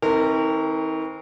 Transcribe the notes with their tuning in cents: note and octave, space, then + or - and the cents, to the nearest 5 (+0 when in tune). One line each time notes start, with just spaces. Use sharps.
D#3 +45 C4 +15 A#4 -30